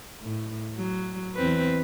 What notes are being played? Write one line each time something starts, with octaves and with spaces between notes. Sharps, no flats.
A2
F#3
E2 C4 B4